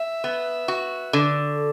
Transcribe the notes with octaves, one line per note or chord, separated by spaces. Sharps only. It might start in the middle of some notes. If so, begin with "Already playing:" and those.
Already playing: E5
B3
F#4
D3